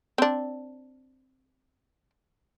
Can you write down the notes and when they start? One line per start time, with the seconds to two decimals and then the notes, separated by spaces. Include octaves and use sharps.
0.18 C4 D4